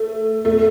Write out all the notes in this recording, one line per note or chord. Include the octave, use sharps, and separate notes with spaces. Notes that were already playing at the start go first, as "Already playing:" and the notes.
Already playing: A3
A3